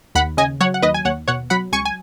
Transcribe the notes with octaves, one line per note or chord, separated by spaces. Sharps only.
D#2 F#5 B5
C#3 D#5 G#5
F#3 C#5 F#5
F#5
D#2 B4 D#5
G#5
D#2 C#5 F#5
B2 C#5 F#5
F#3 F#5 B5
C#2 G#5 C#6
G#5